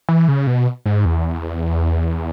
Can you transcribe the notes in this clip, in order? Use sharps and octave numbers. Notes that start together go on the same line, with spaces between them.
E3
C#3
B2
G#2
E2